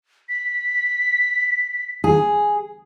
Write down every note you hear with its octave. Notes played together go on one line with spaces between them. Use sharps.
B6
G#4